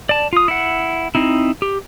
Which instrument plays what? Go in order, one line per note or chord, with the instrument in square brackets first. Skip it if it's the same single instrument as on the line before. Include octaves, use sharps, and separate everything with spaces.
[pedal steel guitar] D5 A5
F4 D#6
E4 F#5
C4 D#4 E4
G4